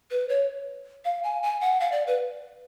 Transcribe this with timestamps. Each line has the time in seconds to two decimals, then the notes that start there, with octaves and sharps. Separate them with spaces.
0.11 B4
0.29 C#5
1.05 F5
1.24 G#5
1.43 G#5
1.61 F#5
1.80 F5
1.92 D5
2.07 B4